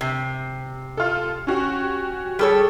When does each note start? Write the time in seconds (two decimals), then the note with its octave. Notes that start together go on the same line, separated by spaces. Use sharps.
0.01 C3
0.97 F4 A4
1.47 C#4 F#4 G4
2.39 G3 G#4 A4 C#5